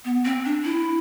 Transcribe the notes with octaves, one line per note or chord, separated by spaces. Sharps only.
B3
C4
D4
E4